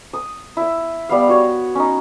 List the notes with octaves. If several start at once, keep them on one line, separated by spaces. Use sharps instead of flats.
D#6
E4 E5
G3 B3 F5
B3 F#4 C#5
C#4 D#4